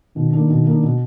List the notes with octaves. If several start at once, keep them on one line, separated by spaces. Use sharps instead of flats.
B2 D#3
A#3 D4
B2
A#3 D4
B2